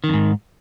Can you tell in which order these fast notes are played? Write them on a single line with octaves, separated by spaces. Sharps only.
D#3 F2 G#2